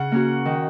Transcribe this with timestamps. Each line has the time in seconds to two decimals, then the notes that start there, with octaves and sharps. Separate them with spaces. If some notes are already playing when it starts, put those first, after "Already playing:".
Already playing: C#3 F#5
0.12 A#3 C#4 F#4
0.45 D#3